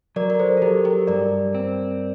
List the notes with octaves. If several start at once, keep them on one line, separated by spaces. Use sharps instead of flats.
F#3 A#4 D5
A#4
A4 C5
A4
F#3 G4 A#4
G4 A#4
G2 A#4 D5
C4